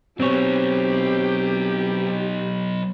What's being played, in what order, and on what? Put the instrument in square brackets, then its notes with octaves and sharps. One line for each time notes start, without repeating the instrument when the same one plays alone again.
[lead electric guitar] F#3 B3 [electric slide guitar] C4 C#5 [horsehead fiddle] G4